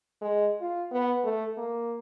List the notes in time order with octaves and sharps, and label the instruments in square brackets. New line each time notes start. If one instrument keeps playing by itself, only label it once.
[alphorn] G#3
F4
B3
A3
A#3